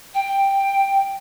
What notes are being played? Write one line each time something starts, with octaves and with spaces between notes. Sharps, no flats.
G5